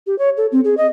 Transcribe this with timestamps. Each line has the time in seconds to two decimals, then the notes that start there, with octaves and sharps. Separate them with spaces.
0.07 G4
0.18 C#5
0.37 A4
0.52 C4
0.64 G#4
0.77 D#5